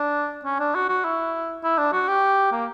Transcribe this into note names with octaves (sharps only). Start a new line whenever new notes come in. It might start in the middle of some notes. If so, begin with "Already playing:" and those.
Already playing: D4
C#4
D4
F#4
F#4
E4
E4
D4
F#4
G4
A#3